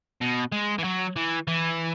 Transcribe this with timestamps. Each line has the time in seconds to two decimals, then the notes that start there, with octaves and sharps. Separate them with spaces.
0.21 B2
0.52 G#3
0.78 E3
0.84 F#3
1.16 E3
1.47 E3